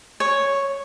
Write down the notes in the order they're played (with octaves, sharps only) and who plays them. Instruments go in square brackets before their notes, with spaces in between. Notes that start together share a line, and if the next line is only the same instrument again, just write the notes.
[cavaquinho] C#5